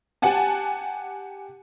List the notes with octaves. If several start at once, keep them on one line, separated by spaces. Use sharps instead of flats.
G4 F#5 G#5 A5